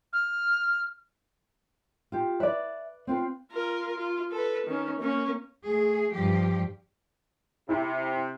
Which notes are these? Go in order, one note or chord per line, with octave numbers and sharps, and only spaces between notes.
F6
F4 G4
B4 D5 E5
C4 F4 B4
F4 A#4
F4
A4 B4
D#3 C#4
A#3 C#4
A3 G#4
G2 F3 G4
C3 E4